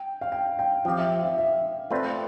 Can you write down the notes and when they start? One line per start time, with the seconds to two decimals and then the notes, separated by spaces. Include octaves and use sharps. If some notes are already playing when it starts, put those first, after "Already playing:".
Already playing: G5
0.21 F5
0.32 G5
0.59 G5
0.85 F3 C4 G4 F5
0.98 E5
1.25 E5
1.38 E5
1.91 A3 C4 F4 B4 D5